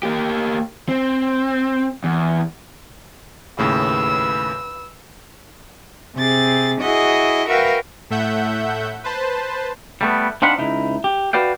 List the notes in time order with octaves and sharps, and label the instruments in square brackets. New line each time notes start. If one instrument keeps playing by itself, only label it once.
[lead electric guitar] A#3 G4
C4
E2
[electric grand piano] D#2 A2 C#3 [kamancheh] B4 E6
[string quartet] C3 C4 G#4 A6
E4 F#4 G#4 D#5
F#4 A#4 B4 E5 F5 G5
[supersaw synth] A2 A3 E5 F#5 G6
B4 C5 A5
[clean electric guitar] G3 A3 B3
C4 D4 D#4 F5 F#5 B5
C#2 D#4 E4
G4
F#4 B4 D5 F5 G5